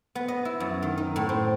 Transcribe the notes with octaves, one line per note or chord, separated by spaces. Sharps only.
B3
D#5
E4
F#2
D#3
D#4
A2
C4